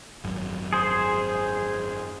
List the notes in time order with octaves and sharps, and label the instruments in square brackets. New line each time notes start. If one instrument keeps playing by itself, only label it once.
[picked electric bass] G#1 F#2
[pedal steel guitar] G#4 C5